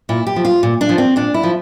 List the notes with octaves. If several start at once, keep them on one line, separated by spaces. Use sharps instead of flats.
A#2 E4
G4
F3
F4
A#2
D4
F3
C4
A#2 D4
E4
F3